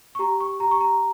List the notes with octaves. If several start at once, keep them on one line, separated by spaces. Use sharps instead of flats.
C#6
G4 A#5
C#6
G4 A#5
C#6
A#5